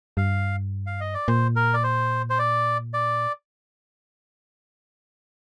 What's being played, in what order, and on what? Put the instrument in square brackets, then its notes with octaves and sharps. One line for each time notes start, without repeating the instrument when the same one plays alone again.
[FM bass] G2 [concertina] F5
[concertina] F5
D#5
D5
[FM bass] A#2 [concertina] C5
[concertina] A#4
D5
C5
C5
D5
D5